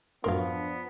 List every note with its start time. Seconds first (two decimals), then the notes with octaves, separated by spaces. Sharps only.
0.24 F#2 A2 F3 B3 D4 A#4 F5 C6